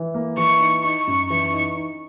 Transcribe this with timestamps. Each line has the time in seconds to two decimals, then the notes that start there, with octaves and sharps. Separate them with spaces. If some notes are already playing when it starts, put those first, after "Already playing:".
Already playing: E3
0.14 A#3
0.37 E3 C#6
0.60 D#4
0.84 D#4 C#6
1.07 F#2
1.29 E3 C#6
1.53 D#4
1.76 D#4